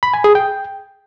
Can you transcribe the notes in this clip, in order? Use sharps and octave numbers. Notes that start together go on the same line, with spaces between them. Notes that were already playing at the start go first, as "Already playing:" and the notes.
B5
G#5
G#4
G5